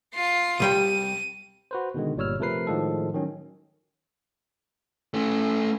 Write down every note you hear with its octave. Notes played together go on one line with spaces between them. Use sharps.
F4 C7
C2 G3 G5 D#7
F#4 B4 C5
B2 D3 D#3 G#3
G1 A#2 G3 C#5 E6 F6
C3 F3 A3 A#4 B4 C7
A2 D#3 F3 G#3 A4
D#3 F#3 C#4
A3 C#4